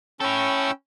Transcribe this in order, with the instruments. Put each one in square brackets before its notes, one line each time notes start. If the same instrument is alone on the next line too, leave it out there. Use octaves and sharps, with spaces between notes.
[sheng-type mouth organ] C#4 G5 E6 [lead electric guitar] E4 A4